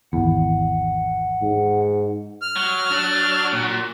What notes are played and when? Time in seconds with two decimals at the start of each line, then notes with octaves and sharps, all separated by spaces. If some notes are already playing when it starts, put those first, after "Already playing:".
0.13 G#1 E2 F#5
1.42 G#2
2.42 F6
2.56 F#3
2.91 D4
3.52 A#2